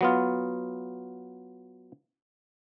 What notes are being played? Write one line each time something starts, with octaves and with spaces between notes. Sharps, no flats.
F#3 B3 F4